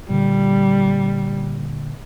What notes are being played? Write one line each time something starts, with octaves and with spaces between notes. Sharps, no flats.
A#2 D3 G3